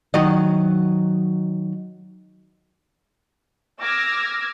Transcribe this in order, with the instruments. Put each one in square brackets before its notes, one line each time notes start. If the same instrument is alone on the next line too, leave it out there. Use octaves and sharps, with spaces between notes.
[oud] D#3 F#3 D#5
[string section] D6 E6 F6 G#6 A#6